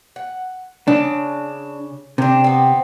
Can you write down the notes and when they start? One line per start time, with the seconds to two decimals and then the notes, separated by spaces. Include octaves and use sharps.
0.16 F#5
0.88 C#3 D4
2.18 C3 C4 D4
2.44 B3 C4